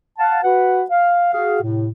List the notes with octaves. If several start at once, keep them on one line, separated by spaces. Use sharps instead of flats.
F5 F#5 A5
F#4 B4 F#5
F5
F#4 G#4 F5
A2 C3